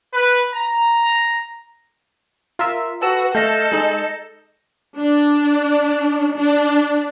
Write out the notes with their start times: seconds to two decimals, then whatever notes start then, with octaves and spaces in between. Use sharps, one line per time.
0.14 B4
0.53 A#5
2.59 F4 A#4 E5
3.02 F#4 A4 B4 E6
3.35 A3 A4 D#5 F5 G6 A#6
3.72 G#3 D#4
4.96 D4
6.35 D4